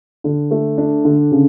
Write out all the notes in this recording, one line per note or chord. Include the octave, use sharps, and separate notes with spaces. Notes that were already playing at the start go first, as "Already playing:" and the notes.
D3
A3
D4
D3
C#3